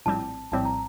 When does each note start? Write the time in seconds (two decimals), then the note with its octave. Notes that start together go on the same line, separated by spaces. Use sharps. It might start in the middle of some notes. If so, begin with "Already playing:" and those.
0.06 A#1 A2 G3 C4 A5
0.52 A#1 A2 G3 C4 A5
0.65 A#5